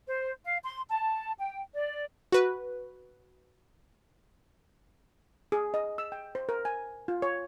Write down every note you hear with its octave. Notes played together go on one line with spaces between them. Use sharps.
C5
F5
C6
A5
G5
D5
F#4 B4
G#4
D#5
E6
G5
C5
A#4
G#5
F4
C#5